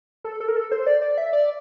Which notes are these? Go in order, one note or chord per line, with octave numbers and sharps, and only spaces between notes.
A4
A4
A#4
A4
C5
D5
D5
E5
D5